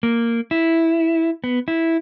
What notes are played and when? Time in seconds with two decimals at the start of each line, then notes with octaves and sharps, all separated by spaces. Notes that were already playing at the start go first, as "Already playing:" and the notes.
0.03 A#3
0.51 E4
1.44 B3
1.68 E4